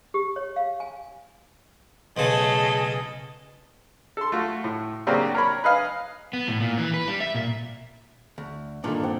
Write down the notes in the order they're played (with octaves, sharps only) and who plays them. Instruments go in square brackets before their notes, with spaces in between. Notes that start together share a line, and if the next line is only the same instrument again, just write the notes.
[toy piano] G4
C#5
F5
G#5
[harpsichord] B1 C#3 [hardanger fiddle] A3 A4 [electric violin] G#4 D#5
[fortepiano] A4 C6
A3 F4 F#4
A2
C#3 F#3 A#3 C4 D4 G4
A#4 C#5 B5
B4 D#5 F5 G#5
[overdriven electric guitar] B3
A2
A#2
E3
B4
G3
E5
A#2
[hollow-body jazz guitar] D2
[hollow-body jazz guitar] G2 A#2 D#3 [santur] D4 A4
[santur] C4 F#5 G5